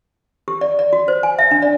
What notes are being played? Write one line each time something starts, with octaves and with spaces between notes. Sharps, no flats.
G4
D5
D5
F#4
C5
G#5
E5
D4
D5